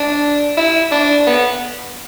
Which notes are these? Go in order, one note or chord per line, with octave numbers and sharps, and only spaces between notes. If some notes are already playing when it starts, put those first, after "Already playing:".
Already playing: D4
E4
D4
B3